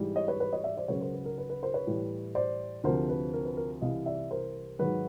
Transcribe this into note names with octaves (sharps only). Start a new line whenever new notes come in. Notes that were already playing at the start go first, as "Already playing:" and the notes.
Already playing: G#2 E3 G3
C#5 D#5
B4 C#5
B4 C#5
C#5 D#5
D5 E5
C5 D5
C#2 C#3 F#3 B4 C#5
A#4 C5
B4
A#4
B4
B4
A#4 C5
B4 C#5
A2 E3 G3
C5 D5
D2 C3 F3 A#4 C5
B4
A#4
B4
A#4
C2 C3 E3 D#5 F5
D5 E5
A#4 C5
G#2 D#3 F#3 B4